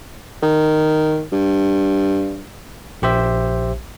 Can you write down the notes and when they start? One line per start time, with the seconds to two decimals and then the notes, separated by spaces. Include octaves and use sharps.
0.43 D#3
1.32 G2
3.02 A#1 G4 C5 E5